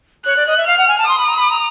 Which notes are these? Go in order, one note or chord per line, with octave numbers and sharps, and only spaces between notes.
C#5 F#6
D5
D#5
E5
F5 F6
F#5
G#5
A5
C6 D#6
B5
A#5
B5
A#5